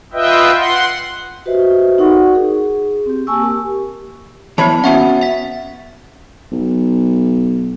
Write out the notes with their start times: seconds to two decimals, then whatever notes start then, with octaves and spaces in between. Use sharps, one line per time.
0.13 F4 B4 D#5 E5 G5
0.58 F#5 C6
1.46 F#4 G4 B4 C5 D#5 E5
1.98 D#4 F#4 A#4 D5 F#5 C#6
2.35 G#4
3.06 C4 G4
3.27 A#3 G#5 A5 C#6 E6
3.42 G4 A#4
4.58 E3 B3 C#5 A5 B5
4.84 B3 C#4 F#4 E5 F#5
5.22 E5 B6
6.52 B1